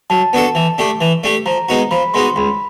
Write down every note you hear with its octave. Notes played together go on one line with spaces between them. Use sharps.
F#3 A5
B3 D4 F#4 A4
E3
A3 D4 G4
E3
A3 D4 G4
F3 A#5
G#3 B3 D#4 F#4
F3 B5
G#3 B3 D#4 F#4 C6
C#2 B5